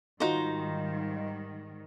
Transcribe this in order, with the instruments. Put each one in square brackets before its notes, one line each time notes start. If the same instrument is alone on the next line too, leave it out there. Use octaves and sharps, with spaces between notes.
[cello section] G#2 D#3 G3 [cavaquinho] D#4 C5 [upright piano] F4 F#4 D#5